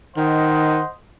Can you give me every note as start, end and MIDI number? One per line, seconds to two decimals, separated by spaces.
0.17 0.80 51
0.17 0.92 72
0.17 0.92 75
0.17 0.92 78